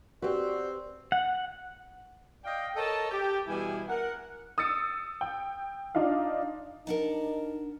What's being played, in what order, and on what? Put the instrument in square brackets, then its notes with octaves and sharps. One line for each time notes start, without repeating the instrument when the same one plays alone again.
[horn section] C4 [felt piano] F#4 [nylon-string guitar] G4 B4 [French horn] D5
[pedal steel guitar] F#5
[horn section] D5 D#5 F5 G5
A4 A#4 C#5 D#5 A5
G4
B2 E3 G3 E4 G#4 G#5
A#4 F#5
[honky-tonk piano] D#6 E6 A6 C#7
G5
D4 D#4 F4 F5
[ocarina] D4 [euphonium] D#4 [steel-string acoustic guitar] A#4 F#5 A5